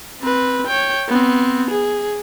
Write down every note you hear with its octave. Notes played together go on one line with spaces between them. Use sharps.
C4 B4
C#5 G5
B3 C4
G#4